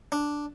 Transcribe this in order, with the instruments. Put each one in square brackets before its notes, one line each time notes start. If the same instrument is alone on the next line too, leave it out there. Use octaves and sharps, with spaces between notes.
[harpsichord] D4